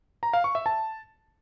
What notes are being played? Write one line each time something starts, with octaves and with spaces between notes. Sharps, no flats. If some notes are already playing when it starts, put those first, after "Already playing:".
A#5
F5
C#6
E5
A5